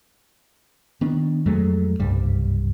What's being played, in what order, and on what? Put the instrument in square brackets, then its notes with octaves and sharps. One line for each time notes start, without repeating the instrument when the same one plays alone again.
[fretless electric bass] D#3 B3 D4
F2 F#3 G#3 A3
F#1 C2 G2 G3